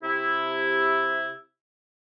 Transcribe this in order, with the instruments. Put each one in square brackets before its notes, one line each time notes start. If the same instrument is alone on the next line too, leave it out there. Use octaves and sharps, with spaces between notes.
[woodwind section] C3 E4